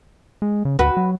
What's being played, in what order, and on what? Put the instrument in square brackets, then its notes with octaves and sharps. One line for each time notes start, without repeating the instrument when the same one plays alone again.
[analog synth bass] G#3
C#3
[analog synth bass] D2 [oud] F#4 B4
[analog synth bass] F#3